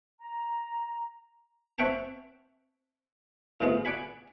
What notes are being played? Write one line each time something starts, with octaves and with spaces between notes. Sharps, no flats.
A#5
C4 C#5 E5 F#5 G5 A5
A2 C3 G#3 B3 F4
D5 F#5 G#5 B5